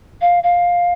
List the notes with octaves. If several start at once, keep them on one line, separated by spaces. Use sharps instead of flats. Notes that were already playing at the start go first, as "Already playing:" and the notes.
F5
F5